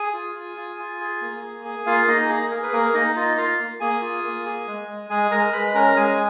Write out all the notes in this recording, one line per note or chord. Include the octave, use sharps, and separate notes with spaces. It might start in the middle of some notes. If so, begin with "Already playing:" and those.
Already playing: G#4 G#5
F4
F4
F4
F4
G#4
A#3
G#4
G#4
A#3 F4 F5
A#3 D#4 D#5
G#4
G#4 A#4
B4
A#3 A#4
A#3 D#4 D#5
D#4 F4 D#5
F4 F5
A#3
A#3 G#4 G#5
F4
A#3
G#4
G#3
G#3
G#3 G#4 G#5
G#3 A#4 A#5
G#3 B4 B5
C#4 A#4 A#5
G#3 G#4 G#5